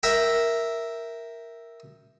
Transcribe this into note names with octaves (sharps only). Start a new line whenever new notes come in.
A#4 E5 G5